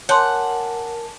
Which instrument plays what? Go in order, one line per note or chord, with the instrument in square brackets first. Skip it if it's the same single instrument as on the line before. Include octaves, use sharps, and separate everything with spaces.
[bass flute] A#4 [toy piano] C#5 C6 [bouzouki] F#5 [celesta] G#5 A5 D6